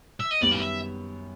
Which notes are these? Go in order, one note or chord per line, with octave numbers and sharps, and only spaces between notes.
E5
D#5
F#2 D#3 G3 B3 D5
F5
E5